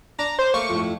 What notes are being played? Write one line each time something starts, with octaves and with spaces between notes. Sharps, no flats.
D4 A#5
C5
A3 A#3 C5 C#6
F2 A2